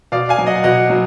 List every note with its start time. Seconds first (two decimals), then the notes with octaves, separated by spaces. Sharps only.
0.12 B2 D5 F5
0.29 F5 G#5
0.38 F#3
0.47 D#5 F#5
0.64 B2 D#5 F#5
0.90 F#3